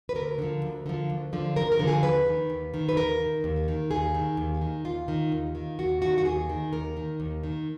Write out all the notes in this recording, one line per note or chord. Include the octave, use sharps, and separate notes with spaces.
B4
D2 A#4
D3 F3
D2
D3 F3
D2
D3 F3
D2 A#4
A#4
D3 F3
G#4
D#2 B4
D#3
D#2
D#3
B4
D#2 A#4
D#3
D#2
D#3
D#2 G#4
D#3
D#2
D#3
D#2 F4
D#3
D#2
D#3
D#2 F#4
D#3 F#4
F#4
D#2 G#4
D#3
D#2 A#4
D#3
D#2
D#3